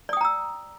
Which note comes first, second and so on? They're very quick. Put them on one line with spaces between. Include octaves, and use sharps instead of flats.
D5 D#6 G5 A#5 E6